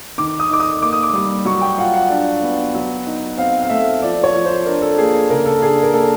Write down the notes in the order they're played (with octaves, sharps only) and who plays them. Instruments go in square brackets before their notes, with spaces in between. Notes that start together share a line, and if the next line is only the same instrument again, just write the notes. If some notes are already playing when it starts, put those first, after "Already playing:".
[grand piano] D#3 D6
D#6
D#4 D6
D#6
A#3 D6
D#6
D6
G3
F#3 C#6
G5
F4 F#5
F#5
D4
B3
F#3
D#4
C4 F5
F5
A3 E5
F3 D5
C#5
F3
C5
D4 A#4
A4
A#3 G#4
C#3 A#4
A4
D4 G#4
A#4
A#3 A4